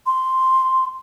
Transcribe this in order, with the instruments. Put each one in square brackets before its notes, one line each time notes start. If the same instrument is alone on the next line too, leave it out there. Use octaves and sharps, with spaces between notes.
[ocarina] C6